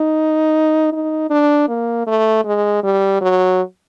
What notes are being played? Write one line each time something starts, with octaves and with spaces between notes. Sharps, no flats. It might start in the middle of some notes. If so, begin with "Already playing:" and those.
Already playing: D#4
D#4
D4
A#3
A3
G#3
G3
F#3